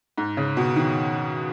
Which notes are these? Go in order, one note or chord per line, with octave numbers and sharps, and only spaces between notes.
G#2
C#3
B2
D#3